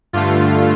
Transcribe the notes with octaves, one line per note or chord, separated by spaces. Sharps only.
G2 D3 A3 F4